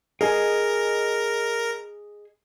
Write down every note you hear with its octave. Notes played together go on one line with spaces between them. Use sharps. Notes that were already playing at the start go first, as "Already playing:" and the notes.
G#4 A#4 D#5 G#5